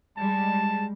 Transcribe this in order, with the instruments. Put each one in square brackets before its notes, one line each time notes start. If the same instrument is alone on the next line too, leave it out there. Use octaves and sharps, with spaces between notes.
[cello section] G3 G#3 [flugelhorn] A5